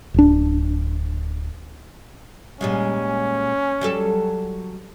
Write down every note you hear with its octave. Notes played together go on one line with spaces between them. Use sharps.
D1 D4
A#2 G3 G#3 C#4
F#3 G3 A4